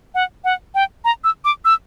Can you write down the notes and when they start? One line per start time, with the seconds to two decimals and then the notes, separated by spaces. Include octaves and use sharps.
0.15 F#5
0.44 F#5
0.75 G5
1.05 A#5
1.24 E6
1.45 D6
1.65 E6